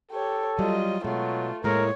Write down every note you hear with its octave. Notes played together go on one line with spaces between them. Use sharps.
G4 A4 C#5
F#3 G3 F4 D#5
B2 F#3 G#3 A3 F4
A2 G#3 A#3 A#4 C#5